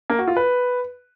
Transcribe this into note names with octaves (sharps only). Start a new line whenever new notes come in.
A#3
F#4
F4
B4